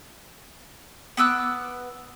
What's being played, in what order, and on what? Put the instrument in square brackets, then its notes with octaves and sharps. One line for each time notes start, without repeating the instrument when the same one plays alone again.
[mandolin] B3 D6 E6 F#6